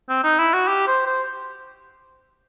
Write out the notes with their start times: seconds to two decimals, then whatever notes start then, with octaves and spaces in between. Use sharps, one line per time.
0.09 C4
0.24 D#4
0.39 E4
0.53 F#4
0.68 G4
0.88 C5
1.07 C5